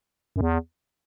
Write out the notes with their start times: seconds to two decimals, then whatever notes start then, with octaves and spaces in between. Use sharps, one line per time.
0.36 F#2
0.41 E2